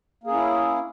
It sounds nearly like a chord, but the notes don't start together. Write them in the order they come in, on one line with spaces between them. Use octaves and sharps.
A#3 G#4 C#4 E4